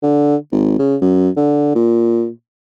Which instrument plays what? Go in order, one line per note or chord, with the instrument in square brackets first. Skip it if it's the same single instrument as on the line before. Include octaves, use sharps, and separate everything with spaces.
[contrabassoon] D3
G#1
C#3
F#2
D3
A#2